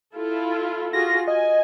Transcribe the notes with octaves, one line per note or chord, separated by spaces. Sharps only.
E4 F4 A4
F4 F#4 G#4 A#6
D#5 G#5